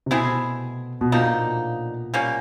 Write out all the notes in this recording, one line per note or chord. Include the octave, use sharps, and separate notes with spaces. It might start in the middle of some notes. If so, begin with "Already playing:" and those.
C3
B2 A3 C4 E4 G#4
B2
A#2 D3 F3 A#3 D#4
G3 A#3 C#4